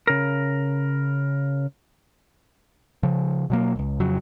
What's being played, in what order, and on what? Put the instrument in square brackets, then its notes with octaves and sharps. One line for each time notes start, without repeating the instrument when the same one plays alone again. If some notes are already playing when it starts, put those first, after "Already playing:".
[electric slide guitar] C#3 A#4
[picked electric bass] C#3 F3
B2 F#3 A#3
E1 C#2
F2 C#3 F#3